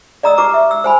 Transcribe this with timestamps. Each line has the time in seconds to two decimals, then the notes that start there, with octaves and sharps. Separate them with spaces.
0.23 D5 D#5 A#5 D#6 E6
0.38 E4 G4 B4 A#5 D6
0.54 E5
0.71 E6
0.84 C5 G#5 B5